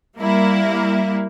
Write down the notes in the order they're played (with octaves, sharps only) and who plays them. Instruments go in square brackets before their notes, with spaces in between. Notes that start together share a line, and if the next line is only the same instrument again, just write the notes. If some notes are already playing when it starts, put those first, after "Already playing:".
[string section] G3 A#3 E4